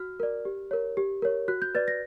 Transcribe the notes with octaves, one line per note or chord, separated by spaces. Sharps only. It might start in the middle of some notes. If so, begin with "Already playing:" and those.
Already playing: F#4 F6
A#4 D5
G4
A#4 C#5
G4
A#4 C#5
F#4 F#6
G6
B4 D5 A6
A#6